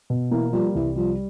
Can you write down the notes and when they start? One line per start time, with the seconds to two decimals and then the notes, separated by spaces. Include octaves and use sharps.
0.10 B2
0.31 E3 A#3
0.52 F3 G3
0.75 C2 E3
0.96 F3 G3